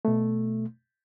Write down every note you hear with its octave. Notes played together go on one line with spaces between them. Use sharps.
B2 A3